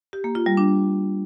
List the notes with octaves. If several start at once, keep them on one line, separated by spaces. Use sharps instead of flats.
G4
A#3
F4
G3
D4